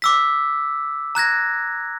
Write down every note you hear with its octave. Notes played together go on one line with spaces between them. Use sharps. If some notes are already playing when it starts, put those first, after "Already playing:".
D6 E6 B6
A#5 F#6 G#6 A#6